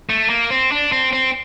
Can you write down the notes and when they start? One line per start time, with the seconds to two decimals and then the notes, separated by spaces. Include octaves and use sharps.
0.09 A3
0.29 A#3
0.50 C4
0.72 D4
0.92 C4
1.13 C4